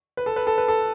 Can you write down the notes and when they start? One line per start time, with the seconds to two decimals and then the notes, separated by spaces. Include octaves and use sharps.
0.17 B4
0.26 A4
0.36 B4
0.47 A4
0.58 B4
0.68 A4